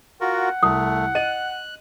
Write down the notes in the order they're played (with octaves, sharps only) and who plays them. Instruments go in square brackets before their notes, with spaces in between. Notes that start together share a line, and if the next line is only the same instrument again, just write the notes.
[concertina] F4 F#4 A#4 [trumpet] F#5
[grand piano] C2 [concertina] A3 [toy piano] D#6
[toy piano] D#5 [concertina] F#6 [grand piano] D#7